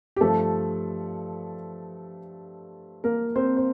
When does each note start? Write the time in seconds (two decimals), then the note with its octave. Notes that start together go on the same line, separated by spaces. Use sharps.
0.16 G4
0.21 G2 F3 A3 A4
3.04 A#3 A#4
3.36 C4 C5
3.57 C5